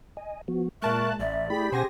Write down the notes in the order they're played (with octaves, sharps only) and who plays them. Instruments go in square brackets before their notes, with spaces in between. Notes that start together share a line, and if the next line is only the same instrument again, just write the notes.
[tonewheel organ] D#5 G#5
F3 B3 F#4
[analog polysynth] A#2 A5 F#6 [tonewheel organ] G#3 [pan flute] A#4 [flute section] E5 C#6
[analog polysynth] A1 [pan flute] D5 [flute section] E5
[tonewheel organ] A3 E4 [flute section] G4 G#4 G5 [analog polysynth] B5 B6
[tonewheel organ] B2 F#5 [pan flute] C#4 [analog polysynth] C5 G#5 A#6